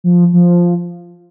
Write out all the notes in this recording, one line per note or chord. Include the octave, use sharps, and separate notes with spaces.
F3
F3